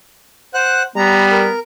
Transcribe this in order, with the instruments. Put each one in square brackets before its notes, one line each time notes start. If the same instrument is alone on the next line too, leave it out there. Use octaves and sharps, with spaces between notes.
[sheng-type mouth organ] C5 F#5 F#6
[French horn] G3 [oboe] B3 [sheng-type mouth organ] A#5
[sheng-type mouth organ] A#4